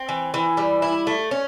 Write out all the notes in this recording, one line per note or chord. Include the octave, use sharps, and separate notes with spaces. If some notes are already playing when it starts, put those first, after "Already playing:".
Already playing: C4
E3
E3
G3
E4
A3
C#4